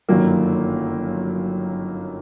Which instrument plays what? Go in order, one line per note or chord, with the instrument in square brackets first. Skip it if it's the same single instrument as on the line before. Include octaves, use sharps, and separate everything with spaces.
[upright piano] G1 F#2 D#3 F#3 A#3